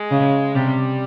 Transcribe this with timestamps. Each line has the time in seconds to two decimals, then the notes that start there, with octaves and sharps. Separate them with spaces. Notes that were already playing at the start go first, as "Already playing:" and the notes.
Already playing: G#3
0.11 C#3
0.55 C3 G3